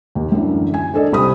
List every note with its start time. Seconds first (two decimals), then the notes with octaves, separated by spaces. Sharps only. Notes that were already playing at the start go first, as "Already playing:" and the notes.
0.15 D#2
0.32 F#2 D3 E3
0.74 G#5
0.94 G#3 D4 G#4 A4 D5 D#5
1.12 C2 C3 B5 D#6